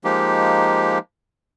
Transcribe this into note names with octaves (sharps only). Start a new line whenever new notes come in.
F3 G#3 A#3 D#4 G4